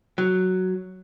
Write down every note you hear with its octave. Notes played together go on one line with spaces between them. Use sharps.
F#3